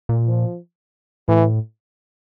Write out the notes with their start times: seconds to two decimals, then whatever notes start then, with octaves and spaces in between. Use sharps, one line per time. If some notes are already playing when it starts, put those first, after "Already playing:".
0.09 A#2
0.27 F3
1.28 A2 E3